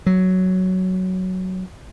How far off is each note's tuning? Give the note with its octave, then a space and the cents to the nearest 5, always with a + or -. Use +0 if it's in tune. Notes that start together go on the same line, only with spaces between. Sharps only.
F#3 +5